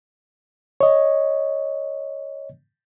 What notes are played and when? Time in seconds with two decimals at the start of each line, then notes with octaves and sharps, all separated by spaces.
0.81 C#5 D#5